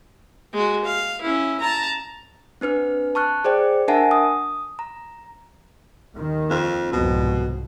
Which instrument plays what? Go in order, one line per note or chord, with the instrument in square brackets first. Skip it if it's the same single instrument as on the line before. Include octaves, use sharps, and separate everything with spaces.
[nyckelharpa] G#3 F#4
F5
C#4 E4
A5 A#5
[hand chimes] C4 D4 B4 F6
A5 C#6 F6 F#6
G#4 C5 D5 G5
D4 A#4 E5 F#5 G#5 A5
D#6
A#5
[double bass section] D#2 D#3
[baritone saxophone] F2
[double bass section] C2 F2 G#2 [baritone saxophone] B2